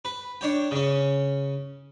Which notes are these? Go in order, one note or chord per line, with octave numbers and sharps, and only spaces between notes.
B4
D4 C#5 G5
C#3 C#4